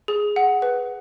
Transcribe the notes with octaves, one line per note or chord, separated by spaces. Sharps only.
G#4
F#5
B4